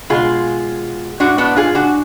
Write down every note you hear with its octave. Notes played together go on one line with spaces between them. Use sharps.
B2 G#3 F4 G#4
A2 G#3 D4 F#4
B3 D4
F4 G#4
D4 F#4